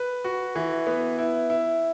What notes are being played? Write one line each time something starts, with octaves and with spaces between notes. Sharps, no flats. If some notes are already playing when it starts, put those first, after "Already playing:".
Already playing: B4
F#4
E3
B3
E4
E4